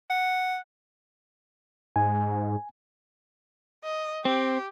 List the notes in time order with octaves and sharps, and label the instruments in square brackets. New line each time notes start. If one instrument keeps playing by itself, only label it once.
[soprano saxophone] F#5
[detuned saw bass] G#2 [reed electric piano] G#5
[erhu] D#5
[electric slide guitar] C4 [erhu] G4